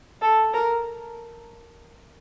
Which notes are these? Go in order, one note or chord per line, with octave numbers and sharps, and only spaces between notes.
A4
A#4